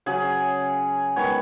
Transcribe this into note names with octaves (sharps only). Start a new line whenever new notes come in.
C#3 F#3 C#4 G#4
D#3 G#3 B3 C#5